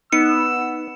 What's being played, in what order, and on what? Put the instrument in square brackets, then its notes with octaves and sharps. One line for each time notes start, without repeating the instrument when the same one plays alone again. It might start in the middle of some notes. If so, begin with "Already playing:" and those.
[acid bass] B3 [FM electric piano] D#4 [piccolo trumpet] E6 [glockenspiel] C#7